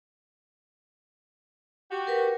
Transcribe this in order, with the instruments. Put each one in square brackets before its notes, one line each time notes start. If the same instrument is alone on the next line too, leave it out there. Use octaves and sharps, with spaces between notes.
[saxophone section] F#4 G4
[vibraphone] A#4 B4